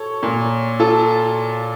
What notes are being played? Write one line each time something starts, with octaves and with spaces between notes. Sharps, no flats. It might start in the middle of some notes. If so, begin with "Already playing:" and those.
Already playing: A4 C#5
A#2
F4 A4